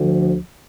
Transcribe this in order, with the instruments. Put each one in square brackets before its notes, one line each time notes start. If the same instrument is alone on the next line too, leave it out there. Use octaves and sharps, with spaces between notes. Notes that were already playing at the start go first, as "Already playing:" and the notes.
Already playing: [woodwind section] D2 D3 F3